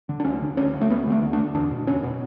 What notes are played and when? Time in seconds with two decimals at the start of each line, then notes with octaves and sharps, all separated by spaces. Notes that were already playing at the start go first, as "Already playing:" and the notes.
0.09 D3
0.20 D4
0.25 D2 C#4
0.42 D3
0.57 D2 C#4
0.74 D3
0.81 A3
0.90 D2 B3
1.07 D3
1.12 A3
1.22 D2
1.33 D4
1.38 D3
1.54 E2 D4
1.71 B2
1.87 E2 C#4
2.03 B2